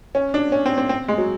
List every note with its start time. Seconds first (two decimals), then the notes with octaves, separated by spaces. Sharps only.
0.15 C#4
0.34 D4
0.52 C#4
0.66 C4
0.78 C4
0.89 C4
1.08 G#3
1.18 F#3